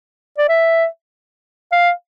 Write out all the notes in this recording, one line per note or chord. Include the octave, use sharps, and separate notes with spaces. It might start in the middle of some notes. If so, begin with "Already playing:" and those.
D5
E5
F5